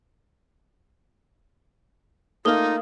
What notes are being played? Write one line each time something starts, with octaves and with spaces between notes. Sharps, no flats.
A3 A#3 D#4 F4 D#6 F6 G7